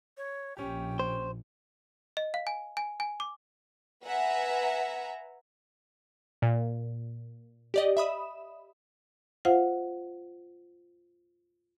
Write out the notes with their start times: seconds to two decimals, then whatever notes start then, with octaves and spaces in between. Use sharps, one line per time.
0.17 C#5
0.57 A#1 C#4 G4 G5
0.99 C5
2.17 D#5
2.34 F5
2.47 G#5
2.77 G#5
3.00 G#5
3.20 D6
4.04 B4 E5 F#5 G#5 A#5
6.42 A#2
7.74 G4 D5 D#5
7.97 E5 B5 D#6 E7
9.45 F4 C5 F5 F#5